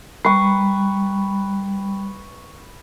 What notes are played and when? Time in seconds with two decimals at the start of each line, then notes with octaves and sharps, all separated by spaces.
0.25 G3 B4 C#6